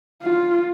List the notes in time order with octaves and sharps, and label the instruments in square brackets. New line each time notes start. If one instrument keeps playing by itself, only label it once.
[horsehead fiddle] F4